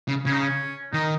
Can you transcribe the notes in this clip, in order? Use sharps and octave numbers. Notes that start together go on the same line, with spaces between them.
C#3
C#3 C#4
D#4
C#4
D#3 D#4